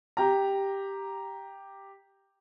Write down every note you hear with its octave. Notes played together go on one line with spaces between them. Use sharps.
G4 A#5